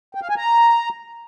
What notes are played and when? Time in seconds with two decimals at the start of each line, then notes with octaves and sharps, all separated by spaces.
0.15 G5
0.22 F5
0.30 G#5
0.37 A#5